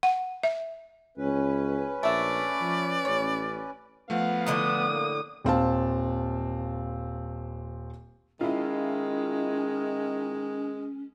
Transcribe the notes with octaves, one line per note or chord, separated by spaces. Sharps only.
F#5
E5
C#2 C#4 B4
A#1 A3 D5 E5
F3
A1 C#5
F3 A3 B3 F5 F#5
A2 D3 A5 D#6
A#3
D#1 C4 F5 A5
D#3 G#3 C#4 E4 F4